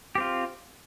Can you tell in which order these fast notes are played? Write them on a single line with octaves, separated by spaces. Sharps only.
G4 C4 F4